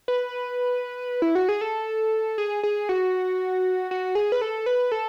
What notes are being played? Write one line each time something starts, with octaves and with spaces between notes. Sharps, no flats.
B4
E4
F#4
G#4
A4
G#4
G#4
F#4
F#4
G#4
B4
A4
B4
A4